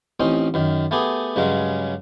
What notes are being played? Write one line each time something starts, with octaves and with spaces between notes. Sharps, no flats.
A1 C4 C#4 D#4
F#2 D#3
A3 B3 G4 G#4
G2 C#3 F#3 G#3 A#5